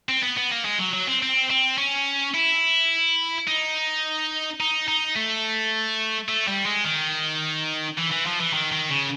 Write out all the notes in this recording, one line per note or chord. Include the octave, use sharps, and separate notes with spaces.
C4
B3
B3
A#3
G#3
F#3
F#3
C4
C4
C4
C#4
E4
D#4
D#4
D#4
A3
A3
G3
G#3
D#3
E3
E3
F3
E3
D#3
D#3
C#3